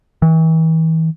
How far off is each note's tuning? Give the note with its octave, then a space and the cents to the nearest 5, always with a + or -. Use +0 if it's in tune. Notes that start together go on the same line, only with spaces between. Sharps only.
E3 -35